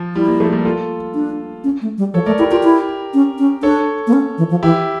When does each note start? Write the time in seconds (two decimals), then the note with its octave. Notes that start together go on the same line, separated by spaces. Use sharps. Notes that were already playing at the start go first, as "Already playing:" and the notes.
Already playing: F3
0.15 G3 E4
0.28 G3 A#3
0.40 F3 A3
0.53 G3 A#3
0.65 F4 A4
1.15 D4
1.64 C#4
1.82 A3
1.98 G3
2.14 F3 A4 C#5
2.26 A3 A#4 D5
2.39 E4 G4 A#4
2.51 F4 G4 A#4
2.64 E4
3.14 C#4
3.38 C#4
3.63 D4 A4 C#5
4.07 A#3
4.13 C#4
4.38 E3
4.51 F3
4.63 E3 E4 G4